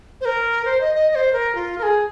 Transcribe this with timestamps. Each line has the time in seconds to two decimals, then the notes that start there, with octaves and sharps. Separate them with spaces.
0.21 C5
0.25 A#4
0.65 C5
0.81 D#5
0.95 D#5
1.11 D#5
1.15 C5
1.33 A#4
1.55 F4
1.78 A#4
1.83 G#4